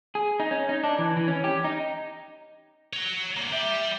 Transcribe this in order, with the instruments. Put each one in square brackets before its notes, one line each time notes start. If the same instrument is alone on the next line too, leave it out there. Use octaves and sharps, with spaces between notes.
[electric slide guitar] G#4
D#4
C#4
D#4
D4
E3
E3
C#4
G4
D#4
[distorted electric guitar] C#5 A#5
D2 A#3
[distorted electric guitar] G3 G4 [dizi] E5